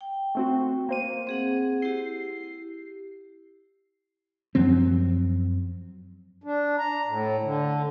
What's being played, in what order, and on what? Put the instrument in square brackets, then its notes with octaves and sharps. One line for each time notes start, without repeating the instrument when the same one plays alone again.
[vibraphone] G5
[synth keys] A3 C4 F#4
A#3 C5 D#7
[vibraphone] C4 G#4 F#5
[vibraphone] E4 G4 [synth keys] C7
[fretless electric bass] F#2 F3 F#3 C4
[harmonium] D4
A#5
A2
D3